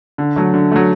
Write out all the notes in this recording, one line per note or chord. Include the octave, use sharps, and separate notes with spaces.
D3
F#3 A3
D3
F#3 A3